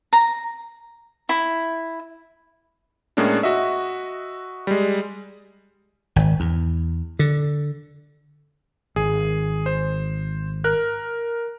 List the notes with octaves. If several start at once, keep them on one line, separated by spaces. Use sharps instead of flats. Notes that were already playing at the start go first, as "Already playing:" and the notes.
A#5
E4
A2 G#3 A#3 C#4 D4
F#4 D#5 E5
G3 G#3
G#1
E2
D3
G#1 G#4
C5
A#4 F#6